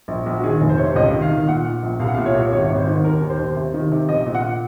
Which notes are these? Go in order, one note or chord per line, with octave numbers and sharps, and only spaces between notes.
A#1
A#1
F#4
D#3 G#4
F1
C5
C3 C#5
C5
C#2 D#5
D#3
F5
D#3
A#2 F#5
A#2
A#1
C2 F5
F#5
F5
A#2
C#5
C2
G#1 C#5
G#1
C5
D#3
D#2 A#4
D#2
C5
D#2
C3
D#3
C3
A#1 D#5
A#2
F#5